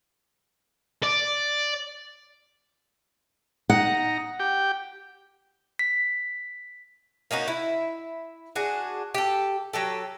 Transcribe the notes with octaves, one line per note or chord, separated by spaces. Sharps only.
D5
D#4 F#5 A#5
G4 G5
B6
A#3 C#4 D#4 F#4
E4
D4 F#4 G#4
G4 A4
F#3 G4 A4